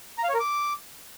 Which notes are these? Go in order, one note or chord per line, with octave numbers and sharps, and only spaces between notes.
A#5
F5
C#5
A#4
D6